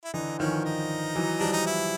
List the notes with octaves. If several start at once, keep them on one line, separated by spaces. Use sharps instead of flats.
E4
D3 E3 D#4
D#3 F3 C#4
D#4
E3 F#3
F3 G3 D4
D#4
E4